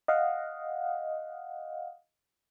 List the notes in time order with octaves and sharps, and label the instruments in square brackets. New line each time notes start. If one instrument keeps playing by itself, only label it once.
[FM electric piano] D#5 F5 F#5